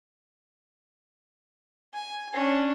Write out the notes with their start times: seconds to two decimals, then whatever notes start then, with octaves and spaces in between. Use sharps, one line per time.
1.94 G#5
2.33 C#4 D4